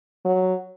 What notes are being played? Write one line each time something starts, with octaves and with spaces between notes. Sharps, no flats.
F#3